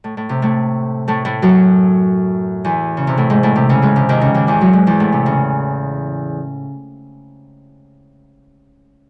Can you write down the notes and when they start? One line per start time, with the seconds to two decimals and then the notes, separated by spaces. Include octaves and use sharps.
0.04 A2
0.17 A2
0.29 C3
0.42 A2 A3
1.08 A2 A3
1.25 A2 A3
1.42 F#2 F#3
2.65 E2 E3
2.97 C#3
3.07 C3
3.18 A2
3.30 G#2
3.43 A2
3.56 C3
3.69 C#3
3.82 G#2 G#3
3.96 C3
4.09 D#2 D#3
4.21 C#3
4.34 D#2 D#3
4.47 E2 E3
4.61 F#2 F#3
4.73 G#2 G#3
4.87 E2 E3
5.00 A2
5.12 C3
5.26 C#3